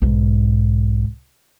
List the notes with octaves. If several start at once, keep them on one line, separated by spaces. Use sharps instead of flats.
B1 G#2